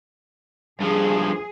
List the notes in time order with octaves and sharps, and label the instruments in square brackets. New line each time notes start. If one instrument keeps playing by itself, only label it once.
[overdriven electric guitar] G2 F3 [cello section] G#4